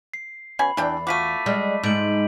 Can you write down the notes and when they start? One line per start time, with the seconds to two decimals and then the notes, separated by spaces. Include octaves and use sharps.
0.14 C7
0.59 B2 C#4 G#5 B5
0.77 E2 E3 D4 G5
1.07 A3 F4 F#4 D6 B6 D#7
1.46 G3 G#3
1.83 G#2 G6 D7 F#7